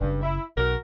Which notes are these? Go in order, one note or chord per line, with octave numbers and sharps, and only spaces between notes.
F#1 G2 C#3
E4
B1 F#4 A#4